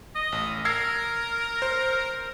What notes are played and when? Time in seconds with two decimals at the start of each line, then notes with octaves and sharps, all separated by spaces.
0.16 D#5
0.32 A1
0.65 A#4 E6 G#6 C7
1.62 C5